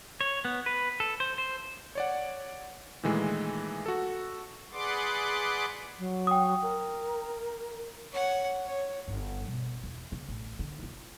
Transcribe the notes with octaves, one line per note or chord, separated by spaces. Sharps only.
C#5
B3
B4
A4
C5
C5
C#5 D5 F#5
A#2 D#3 E3 G#3 A3
F#4 A4
G#4 B4 D5 F#5 C6 D6
F#3
G5 D#6
A#4
C#5 F#5
C#5
G1
B2
E2
C#3
A1
D3
F4